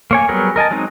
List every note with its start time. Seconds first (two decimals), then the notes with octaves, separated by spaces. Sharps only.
0.11 A#3 C#5 G#5
0.29 F#3 G3 B3 G#4 A#4
0.56 A#4 D#5 G#5 A5
0.71 F#3 G#3 C4 D#4